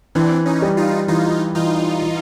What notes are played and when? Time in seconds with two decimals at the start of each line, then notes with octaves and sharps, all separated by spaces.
0.15 E3 C4 D4
0.46 C#4 D#4
0.62 G3
0.77 D#4 F4
1.08 E3 D#4 F4
1.55 E3 D#4 F4
2.02 E3